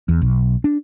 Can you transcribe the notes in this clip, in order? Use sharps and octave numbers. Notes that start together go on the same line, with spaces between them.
E2
B1
D4